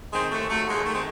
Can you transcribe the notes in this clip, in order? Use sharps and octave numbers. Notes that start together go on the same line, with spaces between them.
D#3 G#3 C4
D#2 A3
F#3 A3
D#2 G#3
D#3 A3
G#3 C4